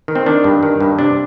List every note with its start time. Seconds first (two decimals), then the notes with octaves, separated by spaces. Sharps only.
0.08 D#3
0.15 C4
0.26 D#3 D4
0.44 G2
0.63 D#3
0.80 G2
0.99 C3 D4